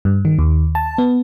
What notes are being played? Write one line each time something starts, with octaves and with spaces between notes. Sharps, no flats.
G2
D#3
D#2
A5
B3